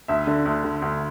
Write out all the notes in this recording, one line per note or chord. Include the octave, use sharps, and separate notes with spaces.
D2 E5
D3
D2
D3
D2